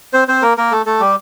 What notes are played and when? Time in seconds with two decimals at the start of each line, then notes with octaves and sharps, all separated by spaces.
0.13 C4 C5
0.28 C4 C5
0.42 A#3 A#4
0.57 A#3 A#4
0.72 A3 A4
0.86 A3 A4
1.00 G3 G4